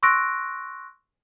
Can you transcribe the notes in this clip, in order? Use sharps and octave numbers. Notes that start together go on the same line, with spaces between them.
C6 C#6 E6 F#6 A#6 D7